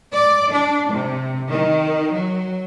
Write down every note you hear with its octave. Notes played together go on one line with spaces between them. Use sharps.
D5
D4
C3
D#3
F#3